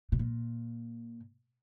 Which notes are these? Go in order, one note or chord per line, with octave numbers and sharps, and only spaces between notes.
B2
A#2